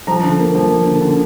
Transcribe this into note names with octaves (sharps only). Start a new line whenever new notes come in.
F3 A#5
D3
A#3
F3
A#3
D3
D3